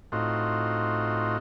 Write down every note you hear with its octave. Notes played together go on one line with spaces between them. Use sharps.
A2 C4 D#4 F4 F#4